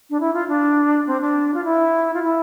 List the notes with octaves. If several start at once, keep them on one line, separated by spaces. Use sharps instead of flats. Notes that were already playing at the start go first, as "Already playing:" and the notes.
D4
E4
F4
D4
C4
D4
F4
E4
F4
E4